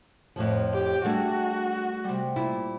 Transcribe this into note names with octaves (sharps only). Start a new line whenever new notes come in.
F2 A2 F3
G4
G3 A3 D4 F#4 G#4
C3 G3
A#2 E4